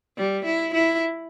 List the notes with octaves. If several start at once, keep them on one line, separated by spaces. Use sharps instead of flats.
G3
E4
E4